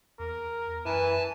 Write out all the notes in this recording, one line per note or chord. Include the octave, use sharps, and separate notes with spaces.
E2 A#4
F#2 E3 B4 G#5 A5